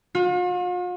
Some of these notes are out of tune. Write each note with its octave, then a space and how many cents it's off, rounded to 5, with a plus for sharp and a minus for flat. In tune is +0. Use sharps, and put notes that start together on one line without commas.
F4 +45